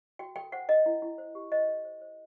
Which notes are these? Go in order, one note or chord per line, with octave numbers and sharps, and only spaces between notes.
F#4 G5
A4 G5
C5 F#5
A4 D#5
E4
E4
C5
G4
C5 D#5
A4
C5
C5